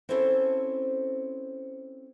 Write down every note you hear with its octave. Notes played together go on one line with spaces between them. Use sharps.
C4 C#4 E4 A4 A#4 C5